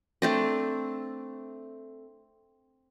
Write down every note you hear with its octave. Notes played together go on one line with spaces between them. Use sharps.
A3 C4 D4